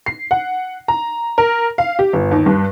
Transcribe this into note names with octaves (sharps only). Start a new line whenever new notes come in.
C7
F#5
A#5
A#4
F5
G4
G1
D#2
G2